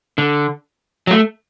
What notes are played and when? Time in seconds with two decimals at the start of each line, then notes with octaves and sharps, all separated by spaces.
0.18 D3
1.07 F#3
1.11 A3